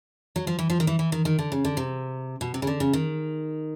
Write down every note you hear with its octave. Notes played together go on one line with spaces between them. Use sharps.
F#3
F3
E3
F3
D#3
E3
E3
D#3
D#3
D3
C#3
D3
C3
B2
C3
C#3
D3
C#3
D#3